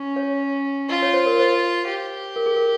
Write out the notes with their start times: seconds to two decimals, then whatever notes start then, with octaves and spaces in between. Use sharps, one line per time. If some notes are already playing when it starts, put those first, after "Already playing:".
Already playing: C#4
0.16 C#5
0.89 F4 D#5
1.02 C#5
1.13 C5
1.26 A#4
1.39 C5
1.88 G4
2.36 A#4
2.46 G#4
2.56 A#4